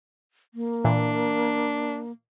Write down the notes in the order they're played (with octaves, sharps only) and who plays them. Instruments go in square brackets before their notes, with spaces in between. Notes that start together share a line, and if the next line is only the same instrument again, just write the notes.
[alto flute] A#3
[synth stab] A#2 E3 [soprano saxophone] D4